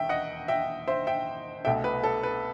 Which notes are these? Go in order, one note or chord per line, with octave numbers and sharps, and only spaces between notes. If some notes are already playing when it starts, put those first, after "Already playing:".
Already playing: E1 D#2 D#3 E5 G5
D#5 F#5
E5 G5
C5 E5
E5 G5
C2 B2 A3 E5 G5
B4
A4
B4